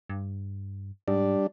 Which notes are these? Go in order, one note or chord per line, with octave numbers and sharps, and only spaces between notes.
G2
G#2 G3 D4